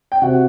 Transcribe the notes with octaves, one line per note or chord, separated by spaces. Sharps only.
G5
C3 F#4 F#5